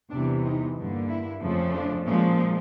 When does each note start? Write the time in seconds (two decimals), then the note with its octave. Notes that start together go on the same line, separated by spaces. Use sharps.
0.11 E2 C3 E3 G3 D4
0.44 D#4
0.76 G2 D3 G3 A#3
1.08 E4
1.42 F2 C#3 F3 A3
1.74 D4
2.06 A#2 F3 G#3 C#4